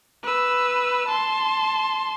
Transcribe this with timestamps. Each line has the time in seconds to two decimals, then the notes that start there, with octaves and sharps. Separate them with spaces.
0.23 B4 E6
1.08 A5 C6